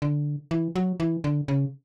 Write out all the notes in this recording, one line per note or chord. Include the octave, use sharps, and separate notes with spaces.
D3
E3
F#3
E3
D3
C#3